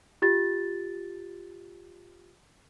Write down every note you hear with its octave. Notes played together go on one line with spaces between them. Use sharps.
F4 G4 A6